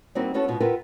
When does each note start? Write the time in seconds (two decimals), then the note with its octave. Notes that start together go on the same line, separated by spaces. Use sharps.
0.15 G3 A#3 C4 D#4 E4 F#4
0.34 B3 C#4 E4 F#4 A4
0.48 G#2 B2 G#3 F4
0.60 F4 G4 A#4 B4 E5 F#5